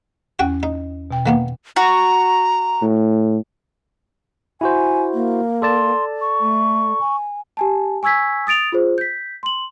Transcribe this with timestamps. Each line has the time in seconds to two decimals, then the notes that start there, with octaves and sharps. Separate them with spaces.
0.39 E2 C#4 F#4 G5
0.63 D#4
1.11 B2 G5
1.26 D#3 A#3 B3
1.76 F#4 A#5
2.82 A2
4.61 E4 F#4 C5 G#5
5.14 A#3
5.62 A4 D5 A5 C6
6.21 C#6
6.40 A3
7.00 G#5
7.57 G4 G#5 A5
8.03 G#5 C#6 E6 G#6 B6
8.47 D#6 A6 D7 F7
8.72 F4 G#4 C5
8.98 G6 B6
9.43 C6 F#7